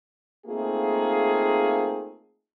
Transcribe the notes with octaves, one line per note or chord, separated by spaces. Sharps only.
A3 A#3 C4 D#4 F4 G#4